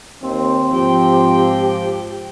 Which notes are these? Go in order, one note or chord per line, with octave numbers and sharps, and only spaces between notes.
D#2 C4
G#2 F3 G4 G5